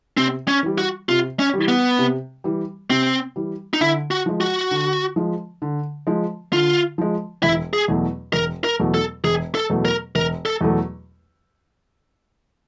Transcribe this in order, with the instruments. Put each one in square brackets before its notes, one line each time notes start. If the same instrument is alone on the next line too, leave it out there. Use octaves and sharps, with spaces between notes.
[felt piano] C3 [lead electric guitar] C4
[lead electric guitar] C#4
[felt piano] E3 G3
[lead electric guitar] F#4
[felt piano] C3 [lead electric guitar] F4
[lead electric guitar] C#4
[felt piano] E3 G3
[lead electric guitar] B3
[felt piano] C3
E3 G3
[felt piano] C3 [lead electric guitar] C4
[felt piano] E3 G3
[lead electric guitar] D#4
[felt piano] D3 [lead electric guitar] E4
[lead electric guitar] F#4
[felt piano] F3 G#3
[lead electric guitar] F#4
[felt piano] D3
F3 G#3
D3
F3 G#3
[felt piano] D3 [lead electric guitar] F4
[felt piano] F3 G#3
[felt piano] E1 [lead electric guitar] E4
[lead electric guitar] G#4
[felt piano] E2 B2 F#3 A3
[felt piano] E1 [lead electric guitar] A#4
[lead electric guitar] A#4
[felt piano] E2 B2 F#3 A3
[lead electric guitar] A4
[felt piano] E1 [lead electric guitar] G#4
[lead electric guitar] A4
[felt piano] E2 B2 F#3 A3
[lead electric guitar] A#4
[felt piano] E1 [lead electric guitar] A#4
[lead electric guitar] A4
[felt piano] E2 B2 F#3 A3